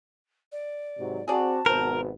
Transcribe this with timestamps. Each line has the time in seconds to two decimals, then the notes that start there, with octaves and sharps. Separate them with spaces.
0.52 D5
0.97 G#2 C3 F#3
1.28 C4 F#4 G#4 D5 A5
1.66 G#1 B2 B3 C4 A#4 C5